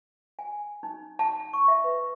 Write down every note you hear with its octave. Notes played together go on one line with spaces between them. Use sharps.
G#5
D#4
A5
C#6
E5
B4